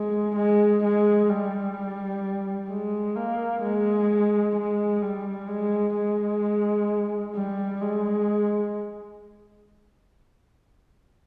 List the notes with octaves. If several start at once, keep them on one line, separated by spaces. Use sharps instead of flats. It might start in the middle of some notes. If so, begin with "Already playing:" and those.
Already playing: G#3
G#3
G#3
G3
G#3
A#3
G#3
G#3
G3
G#3
G#3
G3
G#3